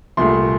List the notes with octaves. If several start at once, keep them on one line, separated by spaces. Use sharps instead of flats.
C2 A#2 A3 C6